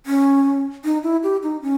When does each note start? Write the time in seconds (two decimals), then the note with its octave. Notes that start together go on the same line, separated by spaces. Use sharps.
0.06 C#4
0.84 D#4
1.03 E4
1.23 G4
1.43 D#4
1.62 C#4